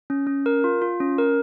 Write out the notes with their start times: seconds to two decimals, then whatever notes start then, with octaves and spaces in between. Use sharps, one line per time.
0.10 C#4
0.27 C#4
0.46 A#4
0.64 F4
0.82 F4
1.00 C#4
1.18 A#4